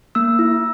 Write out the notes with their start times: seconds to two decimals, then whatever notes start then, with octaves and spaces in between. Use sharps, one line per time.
0.15 A#3 E6
0.39 E4